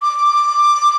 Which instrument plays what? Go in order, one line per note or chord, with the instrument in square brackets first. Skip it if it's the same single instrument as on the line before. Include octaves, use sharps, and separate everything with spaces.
[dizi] D6